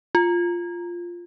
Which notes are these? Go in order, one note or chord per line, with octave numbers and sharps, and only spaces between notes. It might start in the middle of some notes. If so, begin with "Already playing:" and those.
F4